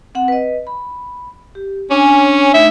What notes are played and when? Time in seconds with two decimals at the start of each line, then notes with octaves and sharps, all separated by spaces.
0.15 C4 F#5
0.28 B4 D#5
0.67 B5
1.55 G4
1.91 C#4 D4 C#5 G#5
2.54 A3 D#4 E5